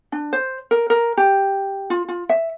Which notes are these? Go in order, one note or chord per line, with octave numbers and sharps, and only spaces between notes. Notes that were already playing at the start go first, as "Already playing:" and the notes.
D4
C5
A#4
A#4
G4
F4
F4
E5